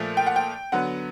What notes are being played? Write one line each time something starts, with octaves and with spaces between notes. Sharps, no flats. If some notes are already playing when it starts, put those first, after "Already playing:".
Already playing: A#2 F3 A3
G5
F#5
G5
D3 F#3 B3 F#5